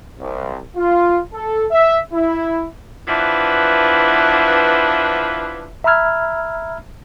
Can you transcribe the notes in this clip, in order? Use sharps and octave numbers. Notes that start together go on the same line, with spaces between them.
C2
F4
A4
E5
E4
E3 F3 B3 D4 B4 E5
E5 A#5 B5 E6 F6 G#6